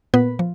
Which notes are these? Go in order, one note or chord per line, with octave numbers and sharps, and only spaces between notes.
A#2 B3 B4
F3